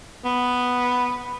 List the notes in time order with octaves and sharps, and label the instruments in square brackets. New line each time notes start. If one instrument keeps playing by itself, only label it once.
[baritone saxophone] B3